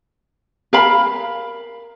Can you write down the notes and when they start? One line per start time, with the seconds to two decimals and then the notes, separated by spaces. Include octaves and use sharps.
0.73 A#4 F5 B5